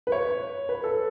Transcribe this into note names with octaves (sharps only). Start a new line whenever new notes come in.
B4
C#5
B4
A4